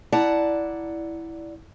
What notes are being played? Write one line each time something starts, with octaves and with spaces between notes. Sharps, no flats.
E4 D5 F#5 A5 A#5